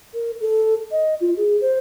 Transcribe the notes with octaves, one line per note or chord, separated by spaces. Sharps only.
A#4
A4
D#5
F4
G#4
C5